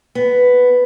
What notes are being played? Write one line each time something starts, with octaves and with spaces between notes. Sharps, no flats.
B3